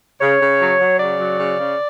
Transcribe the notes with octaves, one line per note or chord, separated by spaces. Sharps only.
C#3 C#5
C#3
F#3
F#3
C#3 D5
F#3
C#3
C#3